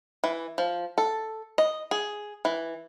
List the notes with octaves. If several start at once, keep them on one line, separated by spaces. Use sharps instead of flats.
E3
F3
A4
D#5
G#4
E3